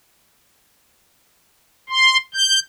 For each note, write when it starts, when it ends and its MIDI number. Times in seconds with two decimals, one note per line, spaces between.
1.90 2.17 84
2.34 2.60 91